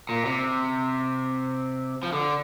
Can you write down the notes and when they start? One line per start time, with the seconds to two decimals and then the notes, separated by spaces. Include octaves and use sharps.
0.09 A#2
0.25 C3
2.03 F3
2.12 D3